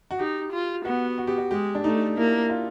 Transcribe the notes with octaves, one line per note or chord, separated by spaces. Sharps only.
F#4
D#4 G4
F4
B3 F#4
F#4
G4
F#4
G#3 G4
D4
A3 D#4
A#3 E4
F4